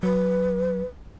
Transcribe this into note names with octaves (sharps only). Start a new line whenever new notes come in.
F#3 B4